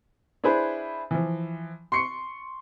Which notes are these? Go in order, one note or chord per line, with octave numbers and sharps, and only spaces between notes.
D4 E4 G#4 B4 C5
E3 F3
C6 C#6 C7 C#7